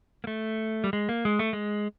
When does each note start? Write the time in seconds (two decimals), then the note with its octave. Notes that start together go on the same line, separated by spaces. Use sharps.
0.24 A#3
0.27 A3
0.84 G3
0.93 G#3
1.09 A#3
1.25 G#3
1.39 A3
1.53 G#3